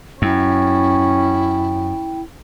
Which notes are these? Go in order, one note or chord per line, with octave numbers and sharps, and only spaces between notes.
F#2 C#4 E4 G5